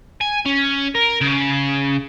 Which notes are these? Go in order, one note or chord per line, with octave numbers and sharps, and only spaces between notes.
G#5
C#4
A#4
C#3